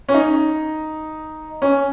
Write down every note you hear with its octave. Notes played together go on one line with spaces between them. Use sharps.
C#4
D#4
C#4